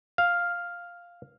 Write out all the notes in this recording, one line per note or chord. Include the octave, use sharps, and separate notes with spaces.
F5